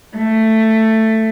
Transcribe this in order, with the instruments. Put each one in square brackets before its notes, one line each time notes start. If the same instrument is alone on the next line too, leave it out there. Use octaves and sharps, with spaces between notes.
[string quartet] A3